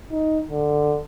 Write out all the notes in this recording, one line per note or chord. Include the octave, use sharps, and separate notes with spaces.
D#4
D3